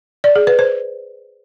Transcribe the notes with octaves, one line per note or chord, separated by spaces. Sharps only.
D5
G#4
B4
C5